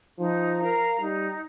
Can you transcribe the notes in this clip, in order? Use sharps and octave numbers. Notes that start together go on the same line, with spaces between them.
F3 D#4
A#4 F5 A#5
G3 D#4